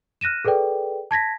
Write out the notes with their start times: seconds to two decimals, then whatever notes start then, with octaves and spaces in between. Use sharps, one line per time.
0.21 F6 F#6 A#6 D#7 E7
0.45 G#4 A4 B4 D5 G5
1.11 A5 G#6 A#6 B6